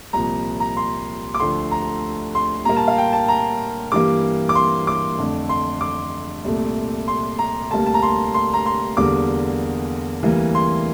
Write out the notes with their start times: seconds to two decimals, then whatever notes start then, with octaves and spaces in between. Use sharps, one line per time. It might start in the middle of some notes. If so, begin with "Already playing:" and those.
0.13 C2 A#2 F3 A#5
0.60 A#5
0.77 C6
1.34 D6
1.40 D2 D3 F3 A3 C6
1.71 A#5
2.35 C6
2.65 A#2 G3 A#3 A#5
2.77 A5
2.87 F5
2.98 G5
3.13 A5
3.28 A#5
3.92 G2 E3 G3 A#3 D6
4.49 D6
4.55 C6
4.87 D6
5.18 F2 D3 A3
5.49 C6
5.81 D6
6.44 C2 A#2 A3
7.08 C6
7.39 A#5
7.70 D2 C3 G3 A#3 A5
7.86 A5
7.94 A#5
8.03 C6
8.34 C6
8.53 A#5
8.66 C6
8.97 E2 D3 G3 A#3 D6
10.23 D2 C3 E3 G3 A#3
10.55 C6